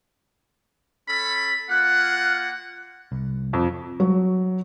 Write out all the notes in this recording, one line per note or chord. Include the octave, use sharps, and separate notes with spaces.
C#4 A4 B5
A#3 F4 F#5 F#6
C2
F2
F#3